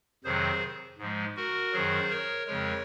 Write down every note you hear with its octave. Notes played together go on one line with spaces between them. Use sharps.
F2 C3 D#3 F#3 G#4 C5
G#2 F3 G#3
F#4 A#4
F#2 D#3 F#3 G#4 C5
A#4 C#5
F2 C#3 F3 G#3 A#4 C#5